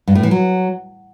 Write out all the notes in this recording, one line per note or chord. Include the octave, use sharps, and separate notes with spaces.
G2
A2
E3
F#3